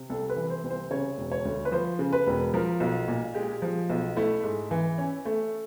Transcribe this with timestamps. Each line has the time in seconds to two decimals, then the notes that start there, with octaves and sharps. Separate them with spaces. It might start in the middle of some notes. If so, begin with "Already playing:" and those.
Already playing: C3
0.10 C2 A4
0.30 B4
0.36 E3
0.50 C5
0.63 C2
0.70 C5
0.91 C#3 C#5
1.18 E1
1.32 C#5
1.45 D2
1.65 B4
1.72 F3 C5
1.99 C#3
2.13 B4
2.27 E1
2.54 F3 A#4
2.80 B1
3.08 A#2
3.35 G#3 G4
3.62 F3
3.90 B1
4.17 A3 E4
4.44 G#2
4.71 E3
4.98 C#4
5.25 A3